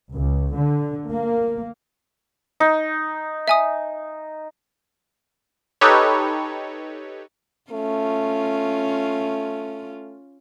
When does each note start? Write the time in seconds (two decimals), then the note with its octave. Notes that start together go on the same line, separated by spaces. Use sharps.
0.12 C#2
0.57 D3
1.09 A#3
2.60 D#4
3.48 E5 G#5 D#6
5.81 D#4 G4 A4 B4 C#5
7.71 A3 C#4 F4